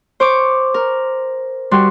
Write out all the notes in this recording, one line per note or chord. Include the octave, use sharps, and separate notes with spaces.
C5 C#6 D6
A#4
G3 F#4 C6